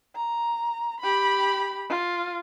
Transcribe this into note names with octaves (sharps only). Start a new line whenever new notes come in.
A#5
G4 B5
F4